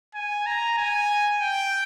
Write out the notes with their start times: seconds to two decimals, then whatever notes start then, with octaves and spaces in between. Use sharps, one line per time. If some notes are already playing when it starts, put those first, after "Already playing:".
0.15 G#5
0.46 A#5
0.77 G#5
1.40 G5